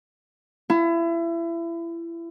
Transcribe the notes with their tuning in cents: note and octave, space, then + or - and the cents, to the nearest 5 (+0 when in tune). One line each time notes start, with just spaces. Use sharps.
E4 +30